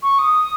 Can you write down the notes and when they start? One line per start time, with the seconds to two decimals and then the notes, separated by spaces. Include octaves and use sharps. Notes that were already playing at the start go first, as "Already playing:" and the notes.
0.03 C#6
0.19 D#6